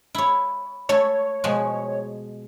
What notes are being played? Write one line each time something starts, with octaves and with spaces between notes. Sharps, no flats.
E4 C#5
A3 A4 C#5
B2 F3 G#3